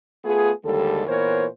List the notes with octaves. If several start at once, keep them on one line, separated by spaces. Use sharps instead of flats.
A3 B3 F4 G#4
D#2 D3 G3 G#3 A4
A#2 E3 B3 A#4 C5 C#5